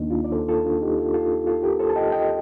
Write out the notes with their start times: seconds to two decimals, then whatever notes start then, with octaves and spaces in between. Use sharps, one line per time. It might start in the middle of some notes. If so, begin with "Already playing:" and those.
Already playing: D#2 D#3 A#3 D4 D#4
0.10 D4 F4
0.24 D5
0.32 A4 C5
0.48 F4 A4
0.65 D4 F4
0.81 D#4 G4
0.97 F4 A4
1.14 F4 A4
1.47 F4 A4
1.63 G4 A#4
1.79 A4 C5
1.90 A5
1.96 D#5 G5
2.12 D#5 G5